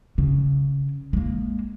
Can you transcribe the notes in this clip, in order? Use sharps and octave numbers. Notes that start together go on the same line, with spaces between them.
C#3
G#3 A#3